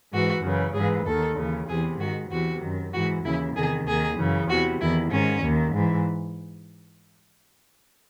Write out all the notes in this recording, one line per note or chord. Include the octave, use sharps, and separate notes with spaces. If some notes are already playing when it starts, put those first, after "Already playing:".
G#2 E3 F#4
F#2 C#3 E3
G#2 E3 G#4
D#2 D#3 A4
D#2 C#3 E3
E2 C3 E3 G#4
G#2 D#3 F#4
E2 C3 E3 F#4
F#2 D#3
G#2 E3 F#4
D#2 C#3 E3 E4
E2 C3 D#3 G#4
D#2 D#3 G#4
F#2 C#3 E3
E2 C3 E3 F#4
E2 D#3 E4
G#2 D#3 C#4
D#2 D#3
G#2 E3